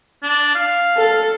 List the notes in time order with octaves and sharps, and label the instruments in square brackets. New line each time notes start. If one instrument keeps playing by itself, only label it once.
[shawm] D4
F5
[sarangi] A4